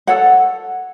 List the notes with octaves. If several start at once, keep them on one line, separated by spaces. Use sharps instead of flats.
A4 C#5 F#5